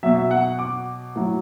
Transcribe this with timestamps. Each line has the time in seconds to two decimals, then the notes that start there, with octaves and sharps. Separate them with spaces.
0.03 B2 F#3 E5
0.16 E5
0.31 F#5
0.59 D6
1.16 A2 F#3